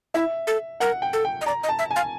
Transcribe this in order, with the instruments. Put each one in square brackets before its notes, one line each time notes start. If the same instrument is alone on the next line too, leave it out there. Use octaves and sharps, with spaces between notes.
[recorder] E4 [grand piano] E5
[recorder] A4
[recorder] A#4 [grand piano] F#5
[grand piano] G5
[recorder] A4
[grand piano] G5
[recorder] D#5
[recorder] D5 [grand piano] A#5
[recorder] D#5
[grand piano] A5
[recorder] E5
[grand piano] G#5
[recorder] F5